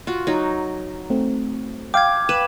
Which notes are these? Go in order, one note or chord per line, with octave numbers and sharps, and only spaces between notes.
F4 F#4
F#3 D#4
A3 C4
F5 G5 D6 G#6
B4 E7